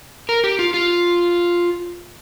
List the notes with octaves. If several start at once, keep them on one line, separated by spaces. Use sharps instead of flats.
A#4
G4
F4
F4